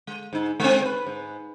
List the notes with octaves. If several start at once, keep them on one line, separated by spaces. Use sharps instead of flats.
G#3
G#2 D#4
G#3 C4
B4 C5
G#2